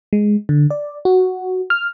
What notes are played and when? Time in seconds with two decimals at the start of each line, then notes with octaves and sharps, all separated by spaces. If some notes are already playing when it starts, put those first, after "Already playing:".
0.13 G#3
0.49 D3
0.71 D5
1.05 F#4
1.70 F6